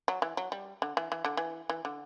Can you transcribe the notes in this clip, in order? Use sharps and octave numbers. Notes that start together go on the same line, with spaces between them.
F#3
E3
F#3
G3
D3
E3
E3
D3
E3
E3
D3